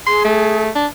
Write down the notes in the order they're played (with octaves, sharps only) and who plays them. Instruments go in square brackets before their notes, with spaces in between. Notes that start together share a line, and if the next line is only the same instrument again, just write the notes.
[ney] G#4 [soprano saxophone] C6
[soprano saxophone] A3
D4